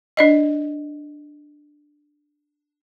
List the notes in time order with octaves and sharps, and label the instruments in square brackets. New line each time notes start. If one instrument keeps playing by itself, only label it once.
[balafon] D4 D5 D#5